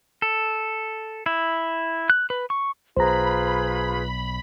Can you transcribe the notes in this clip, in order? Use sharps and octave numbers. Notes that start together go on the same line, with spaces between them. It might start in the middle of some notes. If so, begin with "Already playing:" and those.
A4
E4
F#6
B4
C#6
B1 F4 G#4 B4 C5 A#5 B5